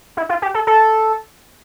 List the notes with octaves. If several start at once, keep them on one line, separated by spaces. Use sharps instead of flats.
E4
F4
G4
A4
A4